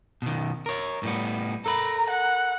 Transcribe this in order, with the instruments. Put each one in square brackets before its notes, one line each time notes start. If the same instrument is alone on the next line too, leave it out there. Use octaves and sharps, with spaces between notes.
[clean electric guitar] B2 D#3
A#4 C#5
A2 G3 B3
[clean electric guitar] A4 A#4 B5 [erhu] A#5
[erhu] F#5